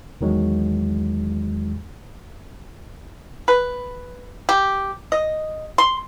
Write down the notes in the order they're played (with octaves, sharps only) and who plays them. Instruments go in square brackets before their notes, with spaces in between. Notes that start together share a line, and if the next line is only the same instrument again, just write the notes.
[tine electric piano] E2 D#3 F#3 G#3
[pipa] B4
G4
D#5
C6